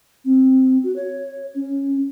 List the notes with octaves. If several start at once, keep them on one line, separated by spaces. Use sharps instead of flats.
C4
F#4
C#5
C#4